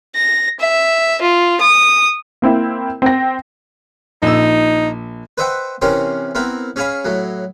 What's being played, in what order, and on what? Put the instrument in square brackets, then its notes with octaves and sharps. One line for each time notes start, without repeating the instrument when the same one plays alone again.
[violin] A#6
E5
F4
D#6
[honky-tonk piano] A#3 C4 E4
C4 G5 A#6
[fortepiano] A#1 E6 [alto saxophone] D#4
[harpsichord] B4 C5 D#5 E5 F#5 G5
C3 E3 C#4 A#4 G5 C6
B3 C4 E4 A#4
C#4 G#4 C#5 F5 G#5 B5
A2 F#3